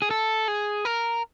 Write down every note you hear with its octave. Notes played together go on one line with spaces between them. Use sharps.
G#4
A4
G#4
A#4